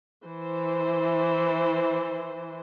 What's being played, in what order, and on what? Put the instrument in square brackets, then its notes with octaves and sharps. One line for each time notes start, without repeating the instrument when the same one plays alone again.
[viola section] E3 C5